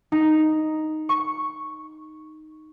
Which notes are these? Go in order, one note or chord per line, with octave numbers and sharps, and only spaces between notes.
D#4
C#6